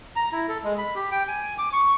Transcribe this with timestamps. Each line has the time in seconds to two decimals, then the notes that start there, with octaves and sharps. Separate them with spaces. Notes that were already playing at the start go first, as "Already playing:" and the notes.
0.16 A#5
0.32 E4
0.48 A4
0.64 G#3
0.78 B5
0.95 G4
1.11 G5
1.28 G#5
1.58 D6
1.73 C#6